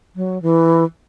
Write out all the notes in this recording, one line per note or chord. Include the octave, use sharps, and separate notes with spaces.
F#3
E3